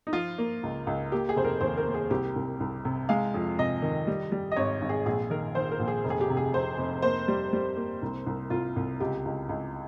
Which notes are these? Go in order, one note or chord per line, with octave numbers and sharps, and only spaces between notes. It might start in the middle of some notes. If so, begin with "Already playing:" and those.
D#4
F3 F4
A#3
C#2
C#2
A#3 G4
G#4
F1 C5
A#4
D#2 C5
A#4
A#3
G#4
C2 G4
C2
C2
C3
G#3 F5
F2
C3 D#5
D#3
G3
G3
D#5
G#1 C#5
G#1
G#4
A#1 G#4
D#3 A#4
D#3 C5
A#4
A#1
G#4
F1
G#4
G4
C3
G#4
F1 C5
F1
A#3 C5
G3
G3
A#3
C2
C2
C2 F4
C2
C#2 G4
C#2
C#2